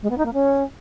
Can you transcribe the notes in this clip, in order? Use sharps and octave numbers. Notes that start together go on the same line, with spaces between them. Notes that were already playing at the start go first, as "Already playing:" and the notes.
G#3
B3
D#4
A#3
C#4